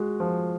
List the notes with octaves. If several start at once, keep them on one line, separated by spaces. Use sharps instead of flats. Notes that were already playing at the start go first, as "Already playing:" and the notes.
Already playing: G#3 F#4
F3